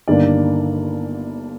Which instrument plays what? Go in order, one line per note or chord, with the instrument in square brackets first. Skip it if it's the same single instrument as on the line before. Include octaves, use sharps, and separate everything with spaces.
[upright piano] G1 G2 D#3 A#3 D4 D5